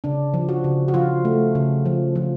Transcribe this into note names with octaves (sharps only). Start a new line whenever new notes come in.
C#3 D4
F3
F#4
C#3
F#4
F3 F4
A3
C#3
F3
F3